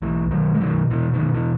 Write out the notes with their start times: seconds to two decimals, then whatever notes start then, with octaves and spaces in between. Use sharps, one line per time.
0.02 B1 E3
0.31 B2 D#3 F#3
0.54 G#3
0.60 B2 D#3 F#3
0.90 B2 E3
1.13 D#3
1.20 B2
1.35 E3